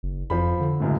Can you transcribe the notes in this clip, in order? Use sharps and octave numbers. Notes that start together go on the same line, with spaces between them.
F#1
F2 F3 B5
D3
C#2 F#2 A2